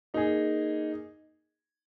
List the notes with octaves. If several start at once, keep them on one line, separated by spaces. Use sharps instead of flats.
A#3 D#4 G#4